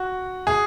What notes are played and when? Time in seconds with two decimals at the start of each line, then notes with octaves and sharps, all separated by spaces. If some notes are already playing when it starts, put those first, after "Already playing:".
Already playing: F#4
0.47 G#4